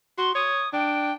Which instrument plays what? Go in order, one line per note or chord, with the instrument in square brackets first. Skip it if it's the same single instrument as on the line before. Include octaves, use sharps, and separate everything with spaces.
[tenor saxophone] F#4 [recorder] C6
[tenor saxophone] C#5 [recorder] D#6
[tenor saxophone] D4 [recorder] G5